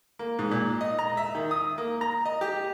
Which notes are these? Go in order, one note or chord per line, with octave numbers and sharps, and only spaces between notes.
A#3
G#2
A#2
D#5
A#5
E5
D#3
D#6
A#3
A#5
D#5
G4